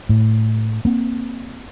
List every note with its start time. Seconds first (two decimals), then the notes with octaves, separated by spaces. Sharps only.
0.09 A2
0.85 A#3 C4